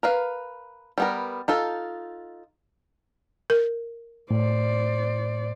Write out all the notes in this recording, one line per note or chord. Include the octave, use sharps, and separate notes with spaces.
A#4 B4 F5
G3 B3 A#4
D#4 F4 A4
A#4
A2 C5 D5